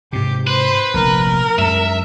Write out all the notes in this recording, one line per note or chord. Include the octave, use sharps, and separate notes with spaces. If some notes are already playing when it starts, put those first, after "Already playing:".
G#2 C3 G4
B4 C5
F1 A#1 A#4
F#2 G#3 E5